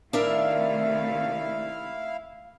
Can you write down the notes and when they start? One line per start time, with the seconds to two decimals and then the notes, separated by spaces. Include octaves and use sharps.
0.13 C3 D#3 A3 D4 E4 A#4 E5 F5